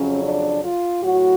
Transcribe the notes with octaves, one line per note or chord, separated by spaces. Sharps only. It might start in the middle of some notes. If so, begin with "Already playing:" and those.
Already playing: F2 C#3 F#3 C#4
D4
F4
A2 F#3 F#4